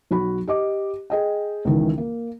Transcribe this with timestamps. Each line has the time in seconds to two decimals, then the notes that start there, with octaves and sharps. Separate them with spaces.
0.11 B1 F#4 B5
0.48 G4 D#5 D6
1.10 G#4 D#5 G5
1.65 C#2 D#3 E3
1.98 A#3